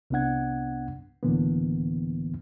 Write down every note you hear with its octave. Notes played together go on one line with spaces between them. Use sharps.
C2 C3 B3 D4 F#5 G#6
C#2 A2 D3 E3 A#3 B3